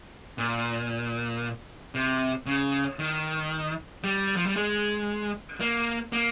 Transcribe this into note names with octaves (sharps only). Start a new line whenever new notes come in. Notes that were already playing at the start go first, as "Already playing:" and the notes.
A#2
C3
C#3
D#3
G3
F3
G3
G#3
A#3
A#3